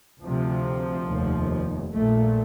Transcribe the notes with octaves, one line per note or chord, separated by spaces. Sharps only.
D2 C3 F3
F1 D#2
A#1 A#2 A3